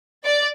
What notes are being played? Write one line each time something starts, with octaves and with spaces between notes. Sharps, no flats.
D5